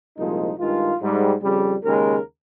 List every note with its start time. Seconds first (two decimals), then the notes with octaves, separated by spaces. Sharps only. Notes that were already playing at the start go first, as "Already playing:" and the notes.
0.17 C2 A#2 F3 G#3 D#4
0.58 G2 D#3 G#3 F4
1.01 G#2 G3
1.42 F2 C#3 G3
1.84 D#2 C#3 G#3 A#4